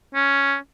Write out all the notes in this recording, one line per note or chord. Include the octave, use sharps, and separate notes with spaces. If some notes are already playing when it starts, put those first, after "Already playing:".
C#4